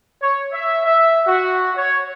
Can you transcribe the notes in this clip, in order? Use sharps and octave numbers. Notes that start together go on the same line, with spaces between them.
C#5
E5
E5
F#4
C#5